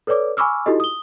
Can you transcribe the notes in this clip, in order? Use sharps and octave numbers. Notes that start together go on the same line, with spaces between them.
A4 B4 C#5 D5 D6
G#5 B5 C#6 D6 E6 F6
D#4 E4 F#4 G4 A4 D#5
D#6 G7